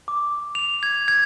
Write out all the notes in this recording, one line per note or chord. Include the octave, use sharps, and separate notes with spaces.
D6
F7
G#6
G#6